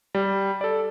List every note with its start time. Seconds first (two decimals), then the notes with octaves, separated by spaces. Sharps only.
0.15 G3
0.61 A4 D5